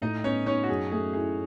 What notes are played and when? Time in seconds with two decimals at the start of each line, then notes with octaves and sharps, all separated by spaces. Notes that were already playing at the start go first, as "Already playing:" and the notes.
0.02 A2 D#4 D#5
0.24 B3 C#4 C#5
0.46 C#4 D#4 C#5
0.63 F#4
0.69 F#2 G#4
0.91 A3 G#4
1.13 E4 G#4